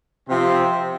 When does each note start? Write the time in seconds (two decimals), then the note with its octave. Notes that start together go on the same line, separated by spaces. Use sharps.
0.27 C3 F3 C4